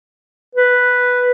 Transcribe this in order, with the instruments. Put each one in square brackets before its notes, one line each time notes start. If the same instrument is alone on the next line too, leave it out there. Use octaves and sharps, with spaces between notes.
[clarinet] B4